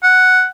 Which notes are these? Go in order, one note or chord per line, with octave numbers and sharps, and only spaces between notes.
F#5